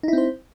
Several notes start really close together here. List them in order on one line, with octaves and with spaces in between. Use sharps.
D#4 E4 C4 C5